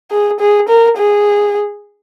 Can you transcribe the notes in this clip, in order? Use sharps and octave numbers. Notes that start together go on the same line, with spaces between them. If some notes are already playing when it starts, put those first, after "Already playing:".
G#4
G#4
A#4
G#4